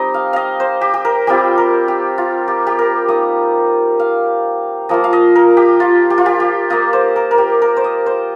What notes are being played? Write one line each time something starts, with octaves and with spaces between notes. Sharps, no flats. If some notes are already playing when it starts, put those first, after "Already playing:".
Already playing: G3 C4 D#4 G4 D#5
F5
D#5 F5
C5
G4
G4
A#4
G3 C4 F4 G4
A#4
G4
F4
G4
G4
A#4
A#3 D#4 D#5
F5
F3 A#3 F4 D#5
F5
D#5
A#4
G4
F4
G4
F4
G4
G4
A#3 F4 D#5
C5
A#4
A#4
G4
A#4
C5
D#5
C5